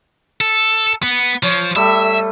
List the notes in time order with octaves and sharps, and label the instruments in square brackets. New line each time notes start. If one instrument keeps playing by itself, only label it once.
[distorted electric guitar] A4
B3
[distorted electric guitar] F3 [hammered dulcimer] C#5
[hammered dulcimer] G3 A3 [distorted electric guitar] E5